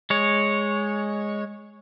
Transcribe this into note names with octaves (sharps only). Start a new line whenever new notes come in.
G#3 C#5